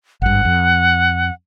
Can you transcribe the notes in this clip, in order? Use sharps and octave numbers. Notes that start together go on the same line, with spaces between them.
G#1 G2 F#5
F2